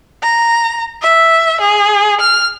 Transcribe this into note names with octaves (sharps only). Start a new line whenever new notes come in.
A#5
E5
G#4
F6